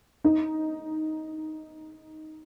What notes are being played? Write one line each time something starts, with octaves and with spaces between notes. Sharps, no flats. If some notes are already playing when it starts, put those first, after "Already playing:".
D#4